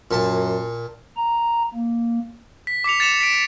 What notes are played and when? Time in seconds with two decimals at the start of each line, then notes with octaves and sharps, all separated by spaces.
0.11 F#2 A#2 A5
1.17 A#5
1.74 A#3
2.67 B6
2.84 D6 B6 C#7 F7
3.00 A6 C#7 E7 F7
3.20 B6 D7